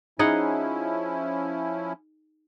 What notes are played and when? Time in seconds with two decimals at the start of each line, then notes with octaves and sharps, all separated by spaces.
0.19 F3 C#4 D#4 E4 G#4 F#5